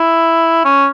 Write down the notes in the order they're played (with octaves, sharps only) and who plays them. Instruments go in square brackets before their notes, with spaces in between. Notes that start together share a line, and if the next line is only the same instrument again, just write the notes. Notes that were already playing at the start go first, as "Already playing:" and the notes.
Already playing: [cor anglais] E4
C#4